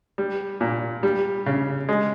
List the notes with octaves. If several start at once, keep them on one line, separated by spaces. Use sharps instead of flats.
G3
A#2
G3
C#3
G#3